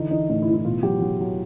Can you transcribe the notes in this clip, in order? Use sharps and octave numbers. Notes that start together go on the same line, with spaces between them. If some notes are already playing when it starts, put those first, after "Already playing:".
Already playing: D3 E3 D#4
E3 D#4
A2 D#4
E4
E3
E4
B2 F4
F#3 G4
F#3
F#3